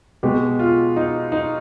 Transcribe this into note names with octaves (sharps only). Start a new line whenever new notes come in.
B2 G#3 G4
F4
D#4
D#4